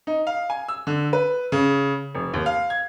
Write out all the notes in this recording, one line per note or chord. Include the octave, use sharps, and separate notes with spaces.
D#4
F5
G#5
E6
D3
B4
C#3
F1
D#2
F5
G#6